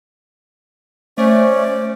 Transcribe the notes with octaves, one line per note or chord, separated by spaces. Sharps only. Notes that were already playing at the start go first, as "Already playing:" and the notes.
A3 C#4 C5 D5